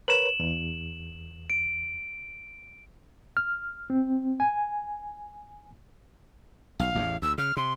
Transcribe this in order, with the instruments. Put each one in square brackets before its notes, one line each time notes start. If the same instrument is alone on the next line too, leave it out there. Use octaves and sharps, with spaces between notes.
[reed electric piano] A#4 B4 C#5 [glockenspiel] E7 F#7
[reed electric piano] E2
[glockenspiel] D7
[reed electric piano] F6
C4
G#5
[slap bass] B1 [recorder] F5
[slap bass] A1 E2 A2
[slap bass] D2 [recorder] E6
[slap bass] C#3 [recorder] F6
[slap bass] C3 [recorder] C6